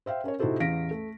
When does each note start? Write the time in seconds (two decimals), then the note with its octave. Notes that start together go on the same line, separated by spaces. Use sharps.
0.06 C5 E5 F5 G5
0.24 C#4 A#4 C#5
0.39 C3 D#4 E4 F#4 A4 C5
0.60 A1 E2 F5 A#6 B6 D7
0.91 A3